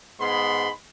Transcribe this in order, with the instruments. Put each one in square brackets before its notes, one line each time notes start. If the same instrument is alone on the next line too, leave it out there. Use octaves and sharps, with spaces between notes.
[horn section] G#2 G#3 B3 B5 C6